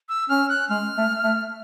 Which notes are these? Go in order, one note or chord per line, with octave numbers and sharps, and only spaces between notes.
E6
C#4 F6
F#6
G#3 F6
A3
A3